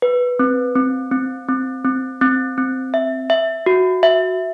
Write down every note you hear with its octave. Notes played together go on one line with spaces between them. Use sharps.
B4
C4
C4
C4
C4
C4
C4
C4
E5
E5
F#4
E5